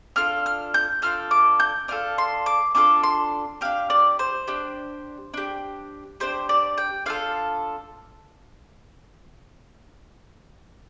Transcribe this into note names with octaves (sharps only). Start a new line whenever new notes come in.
D4 F4 A4 F6
F6
G6
D4 F4 A4 F6
D6
G6
D4 F4 A4 F6
C6
D6
D4 F4 A4 D6
C6
D4 G4 F5
D5
C5
D4 G4
D4 G4
D4 G4 C5
D5
G5
D4 F4 A4 F5